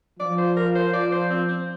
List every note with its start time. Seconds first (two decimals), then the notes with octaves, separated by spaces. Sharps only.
0.20 F3 D5
0.38 C5
0.57 A#4
0.75 C5
0.93 D5
1.12 C5
1.30 C4
1.49 C4